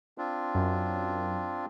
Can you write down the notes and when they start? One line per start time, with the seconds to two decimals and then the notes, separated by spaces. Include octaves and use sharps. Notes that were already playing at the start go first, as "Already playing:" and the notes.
0.18 C4 D4 F4
0.55 F#2